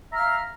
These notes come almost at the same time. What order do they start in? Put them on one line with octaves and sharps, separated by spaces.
E5 A#5 F6 F5